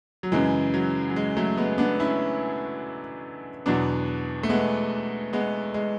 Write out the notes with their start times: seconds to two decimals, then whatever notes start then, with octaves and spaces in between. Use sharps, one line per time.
0.23 F#3
0.32 F#2 C#3 E3 G#3
0.74 F#3
1.10 F#3
1.16 G#3
1.37 F#3 A3
1.57 G#3 B3
1.78 B3 D4
1.99 C#4 E4
3.66 E2 B2 F#3 B3 D4
4.43 A3
4.49 G#3 B3
5.33 G#3 B3
5.74 G#3